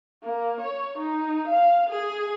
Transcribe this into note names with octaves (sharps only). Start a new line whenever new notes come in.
A#3
C#5
D#4
F5
G#4